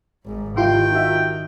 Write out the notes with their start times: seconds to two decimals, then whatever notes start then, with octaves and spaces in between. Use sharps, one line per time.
0.25 G#1 G#2
0.57 D#3 E4 F4 G4 G5 C6
0.91 D#4 F#4 E5